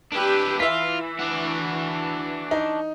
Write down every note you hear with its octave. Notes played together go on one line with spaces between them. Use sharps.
D4 E4 G4 B4
E3 F4 E5 B6
D4 F#4
D#4